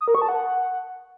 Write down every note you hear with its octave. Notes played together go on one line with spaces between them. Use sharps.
D#6
A#4
C#6
A5
F#5